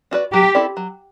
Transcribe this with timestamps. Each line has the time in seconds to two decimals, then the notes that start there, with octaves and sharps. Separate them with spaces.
0.11 D4 F#4 B4 D5
0.33 F#3 G4
0.55 C4 E4 A4 D5
0.77 F#3